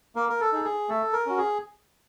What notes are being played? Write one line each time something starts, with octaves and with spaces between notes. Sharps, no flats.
A#3 A#4
A#4
A4
D#4 G#4
G#4
A3 A4
A#4
C#4 F#4
G#4